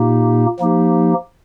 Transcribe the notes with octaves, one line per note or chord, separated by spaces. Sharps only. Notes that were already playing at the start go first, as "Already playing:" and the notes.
Already playing: A#2 A#3 D#4 G4
F3 A#3 D#4 G4